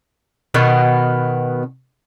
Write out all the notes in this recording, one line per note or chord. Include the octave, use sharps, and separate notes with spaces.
B2 D#3 B3